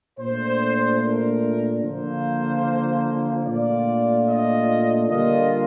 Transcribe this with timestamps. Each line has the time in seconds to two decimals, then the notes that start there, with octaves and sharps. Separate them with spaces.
0.19 A#2 A3 D4 C5
1.01 A#4
1.83 D3 F3 A#3 C5
3.46 A#2 A3 D4 F4 D5
4.28 D#5
5.09 D3 G3 A#3 D4 F4 D#5